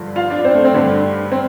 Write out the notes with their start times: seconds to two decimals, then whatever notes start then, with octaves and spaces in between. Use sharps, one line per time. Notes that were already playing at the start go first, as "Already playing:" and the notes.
Already playing: G2 D3 F3 D4
0.16 F4 F5
0.30 D4 D5
0.45 C4 C5
0.55 A3
0.64 C4
0.74 G2 D3 G3 D4
1.32 C4